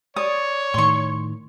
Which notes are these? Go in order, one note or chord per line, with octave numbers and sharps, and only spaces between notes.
C#5 D5 D#6
A2 D#3 C6 C#6